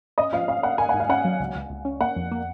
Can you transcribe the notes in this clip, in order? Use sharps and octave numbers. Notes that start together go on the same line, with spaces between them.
C#4 D#5
F3 F5
C#4 F5
A#3 F#5
A#3 G#5
G#2 F#5
F5
C#4 F#5
F#3
C#2
C#2
C#2
C#4
A#3 F#5
F2
A#3